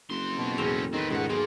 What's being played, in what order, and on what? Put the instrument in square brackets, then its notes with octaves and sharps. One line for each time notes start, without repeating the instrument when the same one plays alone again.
[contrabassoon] F#1 [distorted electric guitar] F2 C6
[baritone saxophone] B2
[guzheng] E2 A2 A#5 [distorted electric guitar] C4 C#4
[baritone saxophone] D#3 [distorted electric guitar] C4 B4
[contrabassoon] C#2 [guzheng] G#2 A3 [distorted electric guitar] B2 F#5
[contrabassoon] B1 [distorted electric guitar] A#3 F4 [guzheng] B3 G#4